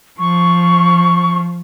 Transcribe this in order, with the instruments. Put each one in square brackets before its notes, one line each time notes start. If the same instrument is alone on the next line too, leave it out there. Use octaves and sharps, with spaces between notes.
[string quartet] F3 [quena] C#6